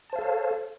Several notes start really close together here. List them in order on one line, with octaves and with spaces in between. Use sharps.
A5 C5 F5 A4 C#5